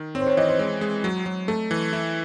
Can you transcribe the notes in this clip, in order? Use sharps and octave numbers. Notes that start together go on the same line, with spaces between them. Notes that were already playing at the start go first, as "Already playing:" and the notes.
Already playing: D#3
C4 C#5
C5
C#5
E3 D#5
C5
G#3 C5
G#3
F#3
F#3
A3 A4
E3
E4